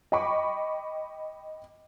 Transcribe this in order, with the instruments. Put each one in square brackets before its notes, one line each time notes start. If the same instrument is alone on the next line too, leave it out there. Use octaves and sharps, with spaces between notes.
[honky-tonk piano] D#5 G5 B5 C#6 D6